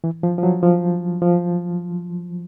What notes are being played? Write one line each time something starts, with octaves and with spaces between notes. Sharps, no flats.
E3
F3
F3
F#3
F3
F3